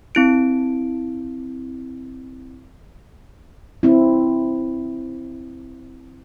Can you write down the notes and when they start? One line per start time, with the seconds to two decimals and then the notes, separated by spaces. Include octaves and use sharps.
0.15 C4 E4 D7
3.83 C4 E4